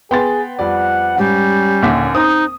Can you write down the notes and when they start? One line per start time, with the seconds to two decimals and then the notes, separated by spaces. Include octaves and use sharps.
0.11 B3 G#4 G5 C6 A6
0.59 F2 G3 D5 F#5
1.18 G#2 G3 C#4
1.82 D#1 D#2 D3 E5
2.15 C4 D#4 D#6